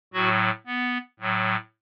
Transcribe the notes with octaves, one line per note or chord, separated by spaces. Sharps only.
A2 F#3 F#4
B3
A2 F#3